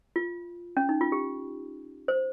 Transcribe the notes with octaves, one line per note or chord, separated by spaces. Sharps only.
F4
C#4
D#4
F4
G4
C5